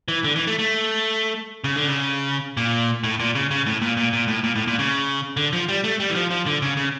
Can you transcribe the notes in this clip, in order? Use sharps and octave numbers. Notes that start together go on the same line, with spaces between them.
E3
D3
E3
A3
A3
C#3
D3
C#3
A#2
A2
A#2
C#3
C#3
A2
A#2
A#2
A#2
A2
A#2
A2
A#2
C#3
D3
F3
G3
A3
G3
E3
F3
F3
D3
C#3
C#3